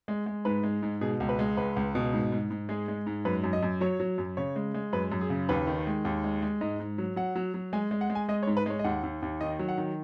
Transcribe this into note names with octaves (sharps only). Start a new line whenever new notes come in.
G#3
G#3
G#2 B4
G#3
G#2
B2 G#4
C#2
B4
G#3
C#2 B4
C#2
B2
G#2
G#2
G#2
G#3 G#4
G#3
G#2
F#2 B4
F#2
D#5
F#2
F#3 C#5
F#3
F#2
C#3 C#5
G#3
G#3
F#2 B4
F#2
G#4
C#3
D#2 B4
D#3
G#3
D#2
G#3
G#3
G#2 D#5
G#2
F#3
F#3 F#5
F#3
F#3
G#3 G#5
G#3
F#5
G#3
G#5
G#3 D#5
C#5
G#2
B4
G#3 C#5
D#5
D#2 F#5
D#2
D#2
D#3 D#5
F#3
F#5
D#3